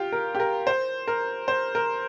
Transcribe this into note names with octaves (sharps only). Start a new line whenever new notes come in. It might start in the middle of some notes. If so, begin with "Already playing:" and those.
Already playing: F4 G4
A#4
G4
A#4
C5
A#4
C5
A#4